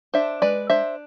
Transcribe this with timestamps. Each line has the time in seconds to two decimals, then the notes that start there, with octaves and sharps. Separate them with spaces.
0.14 D4 C5 E5
0.42 G#3 B4 D5
0.69 D4 C5 E5